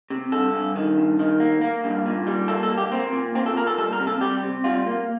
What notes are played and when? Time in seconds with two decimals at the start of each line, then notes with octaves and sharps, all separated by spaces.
0.10 C3
0.32 G2 A4
0.54 G2
0.76 D#3
0.97 G2
1.19 D#3
1.40 A#3
1.61 A#3
1.84 G2
2.06 A#2
2.27 G3
2.48 A#3 A4
2.63 A4
2.69 A#3
2.77 G4
2.92 A#3 C4
3.13 A#2
3.35 A#2 C4
3.46 A4
3.56 A#3 A#4
3.67 A4
3.78 G3 A4
3.93 A#4
4.00 C3
4.07 A4
4.21 G3 G4
4.43 C3
4.64 G3 F4
4.87 A#3